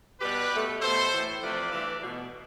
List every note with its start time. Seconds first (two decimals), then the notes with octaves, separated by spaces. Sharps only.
0.20 B2 G3 G4 B4
0.51 B2 A3
0.81 B2 A3 A4 C5
1.12 A2 E3 A3
1.42 C3 F3 A3 B4 D5
1.72 G2 E3 A3
2.03 B2 A3